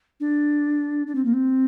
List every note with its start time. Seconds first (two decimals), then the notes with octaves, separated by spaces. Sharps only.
0.20 D4
1.07 D4
1.15 C4
1.25 A#3
1.33 C4